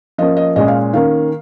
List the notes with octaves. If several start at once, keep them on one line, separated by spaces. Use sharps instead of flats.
F3 A#3 C#4 D#5
D#5
A#2 G#3 C#4 D#5
F5
D#3 A#3 C#4 F5